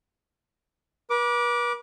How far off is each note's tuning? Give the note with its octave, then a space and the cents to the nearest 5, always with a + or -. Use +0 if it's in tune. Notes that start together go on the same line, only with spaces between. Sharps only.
B4 -40 D6 +0